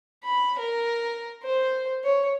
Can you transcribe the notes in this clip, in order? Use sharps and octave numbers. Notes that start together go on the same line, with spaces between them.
B5
A#4
C5
C#5